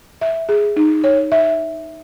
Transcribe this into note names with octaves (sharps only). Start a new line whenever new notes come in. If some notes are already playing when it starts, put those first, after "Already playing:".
E5
G#4
D#4
C#5
E5